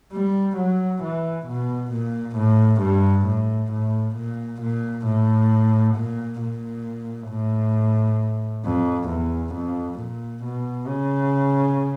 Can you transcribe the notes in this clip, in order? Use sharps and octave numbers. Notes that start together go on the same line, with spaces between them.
G3
F#3
E3
B2
A#2
A2
G2
A2
A2
A#2
A#2
A2
A#2
A#2
A2
F2
E2
F2
A#2
B2
C#3